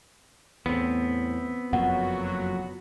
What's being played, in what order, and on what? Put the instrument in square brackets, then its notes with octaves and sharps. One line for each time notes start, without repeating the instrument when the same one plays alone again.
[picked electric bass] E2 A2 [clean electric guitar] B3 C4
[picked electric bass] F#1 F2 A#2 [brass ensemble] F#3 F#4 [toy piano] F#5